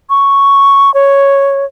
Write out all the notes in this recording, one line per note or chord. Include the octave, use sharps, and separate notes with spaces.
C#6
C#5